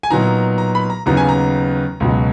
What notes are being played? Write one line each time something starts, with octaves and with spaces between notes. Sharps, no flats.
G#5
A#2 F#3 B3 D#4 A#5
A#5
B5
A#5
D#2 C#3 F#3 B3 D#4 A#5
G#5
A#5
C#2 B2 F#3